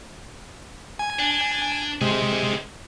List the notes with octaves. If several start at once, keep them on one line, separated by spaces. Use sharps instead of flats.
G#5
D4
C3 G#3 G#4 C5